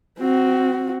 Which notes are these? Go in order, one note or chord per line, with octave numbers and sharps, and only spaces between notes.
C4 F#4